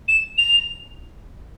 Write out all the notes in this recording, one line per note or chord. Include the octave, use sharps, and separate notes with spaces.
E7
F7